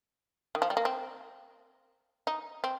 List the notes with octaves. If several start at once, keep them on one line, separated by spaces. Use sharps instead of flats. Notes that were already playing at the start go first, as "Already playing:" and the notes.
D#3
F3
G3
A#3
C4
D#4
C4